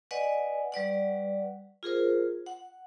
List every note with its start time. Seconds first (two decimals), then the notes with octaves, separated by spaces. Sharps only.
0.11 B4 D5 D#5 F#5 G#5
0.72 G3 B4 D5 F#5
1.83 F4 G#4 A#4 C5
2.46 F#5